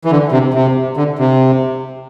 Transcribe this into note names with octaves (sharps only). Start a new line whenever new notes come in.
E3
D3
C3
C3
D3
C3